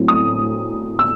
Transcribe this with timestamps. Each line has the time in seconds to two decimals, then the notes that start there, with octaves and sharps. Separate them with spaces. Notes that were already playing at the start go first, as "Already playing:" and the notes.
Already playing: A2 F#3 C4
0.08 D#6
0.99 E6